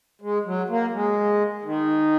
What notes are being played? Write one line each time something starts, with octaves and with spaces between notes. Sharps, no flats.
G#3
F#3
A#3
G#3
D#3